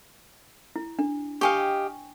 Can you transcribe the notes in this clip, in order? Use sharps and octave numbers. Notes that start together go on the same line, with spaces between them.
E4
D4
G4 D#5 F5 G5 G#5 C#6